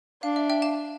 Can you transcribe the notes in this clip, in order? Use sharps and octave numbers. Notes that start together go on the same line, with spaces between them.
D4 F5
E5
E5 G5
F5 A5